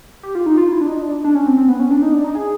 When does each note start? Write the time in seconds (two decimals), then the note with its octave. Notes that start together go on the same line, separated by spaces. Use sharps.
0.23 G4
0.35 F4
0.46 D#4
0.57 F4
0.72 E4
0.81 D4
0.87 D#4
1.02 D4
1.24 D4
1.35 C#4
1.47 C4
1.57 C4
1.68 B3
1.80 C#4
1.91 D4
2.02 D#4
2.13 D4
2.24 D#4
2.35 G#4